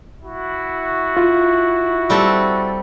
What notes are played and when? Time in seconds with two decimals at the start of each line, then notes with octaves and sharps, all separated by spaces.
0.22 E4 F#4
1.17 F4
2.10 G3 C4 A4